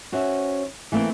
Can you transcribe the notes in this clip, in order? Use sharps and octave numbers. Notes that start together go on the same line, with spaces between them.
C#4 F#4 C5 E5
E3 A3 A#3 C4